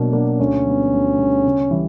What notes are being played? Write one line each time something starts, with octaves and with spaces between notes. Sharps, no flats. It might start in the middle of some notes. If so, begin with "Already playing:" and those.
Already playing: B2 F#3 A#3 D4
F#3 A#3 D4
D2 C#4
D3 G3 B3
D2
D3 G3 B3
C#3
E3 G3